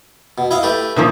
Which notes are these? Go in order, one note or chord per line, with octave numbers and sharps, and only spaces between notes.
B2
E4 D#5 F5
A3 G4 B4
A#2 D#3 F3